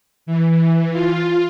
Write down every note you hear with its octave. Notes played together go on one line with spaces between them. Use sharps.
E3
F4